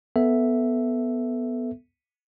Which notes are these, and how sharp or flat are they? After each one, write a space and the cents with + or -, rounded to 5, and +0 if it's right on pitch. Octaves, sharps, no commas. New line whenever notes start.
B3 +0 A4 +0 E5 +0